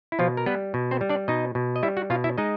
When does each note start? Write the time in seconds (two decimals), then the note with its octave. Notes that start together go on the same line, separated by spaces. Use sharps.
0.12 E4
0.19 B2 F3 F4
0.37 A#4
0.46 G3 B3 B4
0.74 B2
0.91 C4 C5
1.01 G3
1.10 D4 D5
1.28 B2 D#4 D#5
1.55 B2
1.76 D#5
1.83 G3 E4 E5
1.97 F#4 F#5
2.10 B2 F4 F5
2.24 E4 E5
2.38 G#3 D#4 D#5